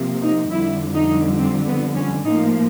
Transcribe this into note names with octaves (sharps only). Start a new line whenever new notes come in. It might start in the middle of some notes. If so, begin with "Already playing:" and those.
Already playing: C3 F3 A#3
D#4
F2 D3 G3 E4
D#4
C4
B3
C#4
A2 F3 A#3 D#4